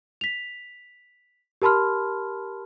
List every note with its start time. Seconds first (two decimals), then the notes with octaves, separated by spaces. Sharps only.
0.21 B6 F7
1.62 G4 A#4 A5 B5 C6 F6